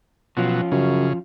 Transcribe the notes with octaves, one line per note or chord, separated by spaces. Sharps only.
B2 F3 F#3 C#4 F4
F#2 C#3